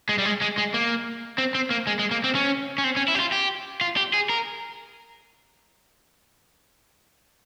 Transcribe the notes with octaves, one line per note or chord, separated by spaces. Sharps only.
G#3
G3
G#3
G#3
G#3
A#3
C4
C4
A#3
G#3
G#3
A#3
C4
C#4
C#4
C4
C#4
E4
G4
F4
G4
F4
G4
G#4
A#4